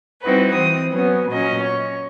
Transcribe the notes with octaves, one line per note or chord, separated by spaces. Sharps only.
G3 C4 D#4 E4 F#4 B4
E3 C4 D#6
F#3 B3 C#4
A#2 F#3 C#4 D#5
C#5